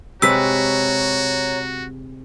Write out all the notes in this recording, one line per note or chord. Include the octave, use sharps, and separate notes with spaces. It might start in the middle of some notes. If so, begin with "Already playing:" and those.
C3 G#3 F#4 B4 C#5 A#5 E6 B6